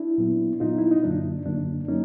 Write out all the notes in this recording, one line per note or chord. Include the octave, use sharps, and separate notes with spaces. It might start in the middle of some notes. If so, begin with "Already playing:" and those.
Already playing: D4 E4
A#2 F#3 B3
A#2 F#3 B3 D#4 F4
E4
D#4
F#2 D3 F#3 A#3 D4
F#2 D3 F#3 A#3 D4
F#3 A#3 C#4 D#4